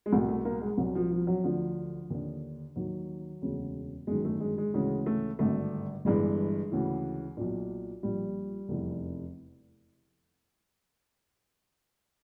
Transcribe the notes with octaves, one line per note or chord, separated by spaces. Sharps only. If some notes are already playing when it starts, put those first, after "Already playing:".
G#3
C2 B2 A3
A3
A#3
G#3
C2 B2 F#3
F3
F3
F#3
D2 D3 F3
D#2 D3
D#2 D#3 F#3
E1 D2 C#3
G1 F#2 D#3 G#3
A3
G#3
G#3
D2 C#3 E3 G#3
A3
G#1 G2 D3 A3
G1 G2 E3 G#3
D2 C#3 E3
B1 A#2
A#1 A#2 G3
F1 E2 C3 E3